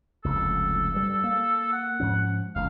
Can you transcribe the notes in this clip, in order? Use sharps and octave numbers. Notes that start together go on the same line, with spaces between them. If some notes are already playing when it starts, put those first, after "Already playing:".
F1 C#2 A4
G2 G3
A#3
F#5
G#2 F3 C#4
F1 C#2 F5